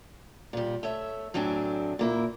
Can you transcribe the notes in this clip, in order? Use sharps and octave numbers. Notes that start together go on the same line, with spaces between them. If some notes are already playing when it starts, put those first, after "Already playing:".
A#2 G3
A3 C#5 E5
A2 F#3 C4 D4 G#5
A#2 A#3 E4